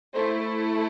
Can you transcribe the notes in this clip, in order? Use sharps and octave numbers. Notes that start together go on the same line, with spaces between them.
A3 E4 A4 C5